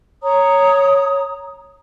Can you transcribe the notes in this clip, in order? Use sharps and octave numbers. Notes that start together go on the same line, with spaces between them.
C#5 A#5 D#6